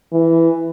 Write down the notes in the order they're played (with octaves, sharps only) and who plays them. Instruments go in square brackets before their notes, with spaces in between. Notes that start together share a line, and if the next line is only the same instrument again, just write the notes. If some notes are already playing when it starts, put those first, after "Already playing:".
[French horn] E3